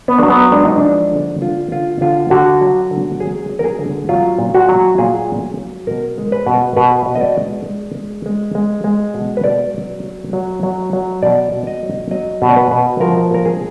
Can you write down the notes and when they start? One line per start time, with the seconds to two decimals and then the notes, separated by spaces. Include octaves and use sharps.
0.08 B3
0.18 F#3 D4
0.30 B3
0.52 G#3 D4
0.65 D#4
0.78 F3 D4
1.12 D3
1.42 D3 F4
1.72 D3 F4
2.01 D3 F4
2.30 D3 F#4
2.61 F#3
2.91 D3
3.20 F#3 G#4
3.50 F#3
3.59 A#4
3.64 G#4
3.79 D3
4.09 F#3 F4
4.38 A#2
4.55 F#4
4.69 F#3
4.98 A#2 G#4
5.29 F#3
5.58 F#3
5.87 B2 A#4
6.18 G#3
6.32 B4
6.47 B2
6.76 B2 B4
7.06 B2
7.15 D#5
7.21 D5
7.37 G#3
7.66 G#3
7.95 G#3
8.26 G#3
8.55 G#3
8.84 G#3
9.14 B2
9.37 B4
9.44 B2 D5
9.74 F#3
10.04 F#3
10.33 F#3
10.63 F#3
10.93 F#3
11.23 B2 D5
11.52 B2
11.67 D#5
11.83 F#3
12.11 F#3 D#5
12.42 B2
12.49 D5
12.56 B4
12.71 B2
13.00 F3 A#4
13.30 A#2 A#4
13.45 G#4